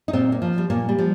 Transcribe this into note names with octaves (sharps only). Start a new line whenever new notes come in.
D#4
A#2 C4
A#3
F3
G3
A#2 A#3
G3
F3